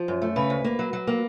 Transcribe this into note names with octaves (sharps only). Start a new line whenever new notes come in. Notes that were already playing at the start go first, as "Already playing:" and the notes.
Already playing: F3
F#2
A3
C#3 B4
D2
A#3
F#3
F#3
A#3